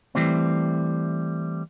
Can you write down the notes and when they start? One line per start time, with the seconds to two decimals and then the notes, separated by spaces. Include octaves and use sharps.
0.15 E3 G3 A3 C4